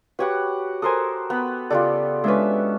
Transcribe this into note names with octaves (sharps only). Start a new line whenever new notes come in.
F#4 G4 B4 C#5 F#5 B5
A4 A#4 C5 G#5 C6 D#6
B3 B5
C#3 F4 G4 A4 D5
G#3 C#4 D4 B4 E5